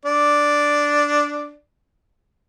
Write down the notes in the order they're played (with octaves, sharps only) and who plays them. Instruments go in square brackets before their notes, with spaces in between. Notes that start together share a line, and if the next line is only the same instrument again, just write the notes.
[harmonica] D4 D5